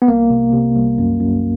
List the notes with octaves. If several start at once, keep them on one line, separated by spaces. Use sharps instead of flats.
B3
C2 A#3
C3
C3
C2
F#2
F#2